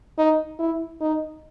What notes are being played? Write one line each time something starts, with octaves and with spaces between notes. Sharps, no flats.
D#4
E4
D#4